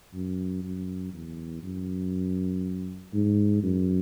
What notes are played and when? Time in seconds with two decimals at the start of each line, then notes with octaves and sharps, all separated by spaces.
0.14 F#2
0.63 F#2
1.13 E2
1.63 F#2
3.13 G#2
3.63 F#2